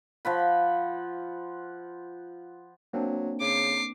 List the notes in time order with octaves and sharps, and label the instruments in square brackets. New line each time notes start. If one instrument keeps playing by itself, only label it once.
[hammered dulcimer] F3 F#5 B5
[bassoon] F#3 [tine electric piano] A#3 C4 D4
[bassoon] C#3 [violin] D6 C7